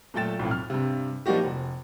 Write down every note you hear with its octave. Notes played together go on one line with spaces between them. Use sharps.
A#2 F#3 A3 G5 A6 E7
B1 F2 A2
F6
G2 C3
F3 G3 A#3 D#4 F#4 G4
F1